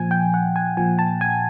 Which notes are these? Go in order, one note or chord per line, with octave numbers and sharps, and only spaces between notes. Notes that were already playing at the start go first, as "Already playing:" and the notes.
Already playing: A#2 F3 G#5
G5
F#5
G#5
A#2 F3 G#5
A5
G#5